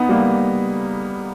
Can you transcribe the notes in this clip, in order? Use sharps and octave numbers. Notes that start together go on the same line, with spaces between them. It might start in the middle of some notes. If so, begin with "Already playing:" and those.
Already playing: B3 D#4
G3 A#3